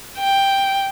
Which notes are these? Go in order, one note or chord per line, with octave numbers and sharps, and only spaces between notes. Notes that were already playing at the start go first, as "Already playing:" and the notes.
G5